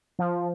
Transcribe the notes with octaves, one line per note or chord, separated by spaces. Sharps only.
F3